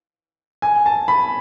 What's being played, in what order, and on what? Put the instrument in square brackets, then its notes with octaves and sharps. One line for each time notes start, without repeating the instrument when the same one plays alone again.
[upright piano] G#5
A5
B5